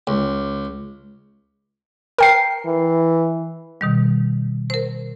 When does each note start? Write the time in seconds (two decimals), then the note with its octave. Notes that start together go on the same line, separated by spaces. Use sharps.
0.07 C#2
2.18 A#4 G5 C7
2.66 E3
3.81 B2 D#3 G3
4.70 A#4 C5